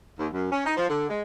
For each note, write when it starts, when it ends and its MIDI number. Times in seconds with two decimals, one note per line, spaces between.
0.18 0.27 39
0.33 0.50 42
0.51 0.65 61
0.65 0.76 63
0.77 0.89 53
0.89 1.05 50
1.09 1.22 56